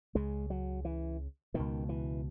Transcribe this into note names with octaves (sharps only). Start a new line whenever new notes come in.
C#2 C#3 G#3
F#3
E3
C#2 B2 D#3
E3